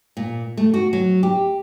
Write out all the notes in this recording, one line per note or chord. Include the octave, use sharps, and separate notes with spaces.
A#2
A3
F#4
F#3
G4